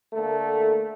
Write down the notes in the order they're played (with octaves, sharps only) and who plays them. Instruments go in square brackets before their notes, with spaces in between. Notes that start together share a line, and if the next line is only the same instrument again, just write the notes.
[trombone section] D3 A3 A#3 A4